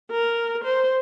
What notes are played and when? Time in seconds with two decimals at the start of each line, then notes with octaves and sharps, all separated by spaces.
0.11 A#4
0.64 C5